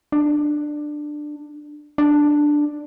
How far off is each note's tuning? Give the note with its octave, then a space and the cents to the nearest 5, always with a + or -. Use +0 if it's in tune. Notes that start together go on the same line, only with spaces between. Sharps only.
D4 +15
D4 +5